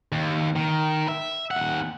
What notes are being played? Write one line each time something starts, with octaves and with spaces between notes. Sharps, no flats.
D#2
D#3
E5
D#2 F#5